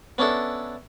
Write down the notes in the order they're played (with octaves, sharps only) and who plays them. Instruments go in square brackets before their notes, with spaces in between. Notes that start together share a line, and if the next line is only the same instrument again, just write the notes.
[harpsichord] B3 C#4 D4 E4 A4